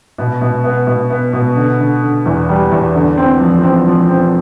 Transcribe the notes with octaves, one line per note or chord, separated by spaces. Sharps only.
B2
B2
B3
B2
B3
B2
D3
D3
D3
E2
G3
E2
D3
C4
F3
C4
F3
C4